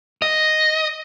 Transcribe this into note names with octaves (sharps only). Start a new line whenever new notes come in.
D#5